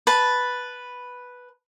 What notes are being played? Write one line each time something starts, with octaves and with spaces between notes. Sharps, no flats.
B4 A5